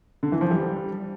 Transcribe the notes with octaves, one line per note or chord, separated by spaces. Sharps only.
D3
E3
F3
G3